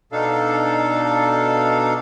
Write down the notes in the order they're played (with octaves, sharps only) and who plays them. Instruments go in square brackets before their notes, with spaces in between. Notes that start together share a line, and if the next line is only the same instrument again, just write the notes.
[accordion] B2 D4 D#4 A4 F5